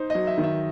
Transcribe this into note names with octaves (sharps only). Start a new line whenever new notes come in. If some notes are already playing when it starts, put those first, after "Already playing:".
Already playing: D#4 C5
F#3 D#5
E5
D#3
E5